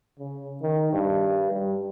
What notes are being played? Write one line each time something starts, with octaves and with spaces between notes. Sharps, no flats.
C#3
D#3
G2
G3